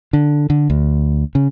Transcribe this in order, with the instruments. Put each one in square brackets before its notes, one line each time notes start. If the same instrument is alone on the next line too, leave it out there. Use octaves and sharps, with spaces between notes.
[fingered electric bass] D3
D3
D2
C#3